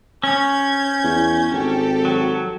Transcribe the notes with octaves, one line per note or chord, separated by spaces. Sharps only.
C#4 G6 G#6
E2
G#1 G4 A4
F#3